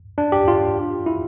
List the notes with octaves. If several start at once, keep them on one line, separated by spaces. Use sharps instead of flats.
D4
G4
F4
E4